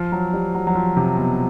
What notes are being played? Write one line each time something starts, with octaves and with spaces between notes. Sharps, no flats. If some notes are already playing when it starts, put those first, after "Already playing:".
Already playing: F3
F#3
G3
F#3
F#3
F3
C3
B2